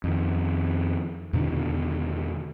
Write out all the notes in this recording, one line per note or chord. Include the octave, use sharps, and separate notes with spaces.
F2 D#3
E2 B2 D3 D#3